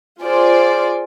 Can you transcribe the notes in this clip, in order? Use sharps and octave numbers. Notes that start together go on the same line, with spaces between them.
F4 G#4 C5 D5